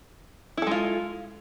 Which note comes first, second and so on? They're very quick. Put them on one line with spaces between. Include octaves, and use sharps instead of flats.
E4 A4 G#3 F4